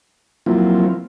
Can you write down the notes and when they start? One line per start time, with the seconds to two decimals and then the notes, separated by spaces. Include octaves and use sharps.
0.46 F3 F#3 A#3 C4 E4 F4